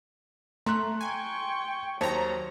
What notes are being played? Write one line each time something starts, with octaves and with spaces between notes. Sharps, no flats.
A3 A#5 C6 F#6
G5 G#5 C#6
D#2 F#3 C5 C#5 A5 A#5